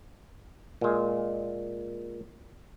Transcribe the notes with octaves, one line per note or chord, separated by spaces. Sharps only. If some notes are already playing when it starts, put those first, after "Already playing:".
A#2 G#3